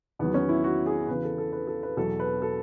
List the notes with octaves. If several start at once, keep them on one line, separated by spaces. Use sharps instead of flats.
E2 D#3 F#3 B3
C#4
E4
F#4
G#4
E2 C#3 E3 B4
A4
A4
B4
A4
B4
E2 B2 F#3 A4
B4
A4